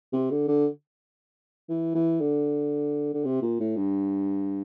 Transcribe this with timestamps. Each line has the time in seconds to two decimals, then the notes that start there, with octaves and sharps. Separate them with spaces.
0.13 C3
0.31 D3
0.48 D3
1.69 E3
1.95 E3
2.21 D3
3.14 D3
3.24 C3
3.42 A#2
3.60 A2
3.76 G2